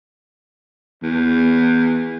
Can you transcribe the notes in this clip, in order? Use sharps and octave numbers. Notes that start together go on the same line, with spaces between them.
E2